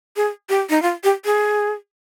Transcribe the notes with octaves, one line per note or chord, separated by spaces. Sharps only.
G#4
G4
D#4
F4
G4
G#4